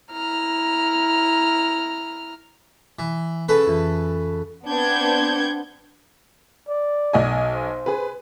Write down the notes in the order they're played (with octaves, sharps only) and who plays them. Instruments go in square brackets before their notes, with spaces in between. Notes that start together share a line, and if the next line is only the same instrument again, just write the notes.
[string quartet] E4 A#5 F6
[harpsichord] E3
C#3 A4 B4
[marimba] F2 E3
[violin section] B3 C4 D4 F#5 G6 G#6
[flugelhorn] D5
[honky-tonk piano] B1 D#5 G#5
[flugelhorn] C5
[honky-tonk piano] G#4 B4